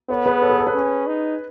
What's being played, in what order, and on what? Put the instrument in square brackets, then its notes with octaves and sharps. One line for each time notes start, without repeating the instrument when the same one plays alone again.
[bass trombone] B3 [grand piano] A4 C#5
[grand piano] G#4 B4
A4 C#5
G#4 B4
A4 C#5
G#4 B4
[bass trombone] C#4
D#4